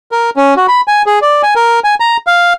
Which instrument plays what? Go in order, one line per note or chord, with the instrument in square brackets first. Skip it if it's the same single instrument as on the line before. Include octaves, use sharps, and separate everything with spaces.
[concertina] A#4
C#4
F#4
B5
G#5
G#4
D5
G#5
A#4
G#5
A#5
F5